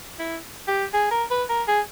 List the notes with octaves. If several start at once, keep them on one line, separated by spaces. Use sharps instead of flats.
E4
G4
G#4
A#4
B4
A#4
G#4